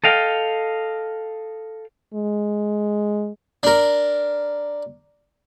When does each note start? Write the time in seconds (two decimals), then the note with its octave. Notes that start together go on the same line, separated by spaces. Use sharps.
0.04 A4 D#5 F5 G5
2.14 G#3
3.63 D4 A#4